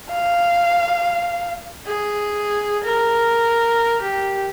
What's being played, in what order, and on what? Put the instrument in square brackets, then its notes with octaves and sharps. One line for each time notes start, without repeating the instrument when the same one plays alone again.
[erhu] F5
[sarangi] G#4
A#4
G4